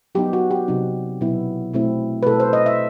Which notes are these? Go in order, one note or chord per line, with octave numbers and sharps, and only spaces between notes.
F#3 B3 D#4 G4
F#4
G4
C3 F#3 C4 D#4
B2 F#3 B3 E4
B2 A3 C4 E4
B4
B2 A3 E4 A4
C5
D#5
E5